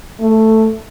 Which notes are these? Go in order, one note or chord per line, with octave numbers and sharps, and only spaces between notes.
A3